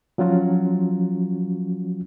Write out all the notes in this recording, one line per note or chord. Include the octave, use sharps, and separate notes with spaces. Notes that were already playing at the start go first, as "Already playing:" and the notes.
F3 F#3 C#4 F4 F#4